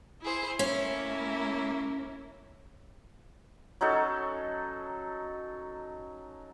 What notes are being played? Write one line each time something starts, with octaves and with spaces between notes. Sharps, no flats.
E4 G#4 C5
A3 A#3 C#4 E4
F#3 C#4 D#4 A4